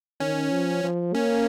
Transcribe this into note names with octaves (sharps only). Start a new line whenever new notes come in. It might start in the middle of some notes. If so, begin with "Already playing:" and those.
D#3 C#4
F3
F3
A#3 C#4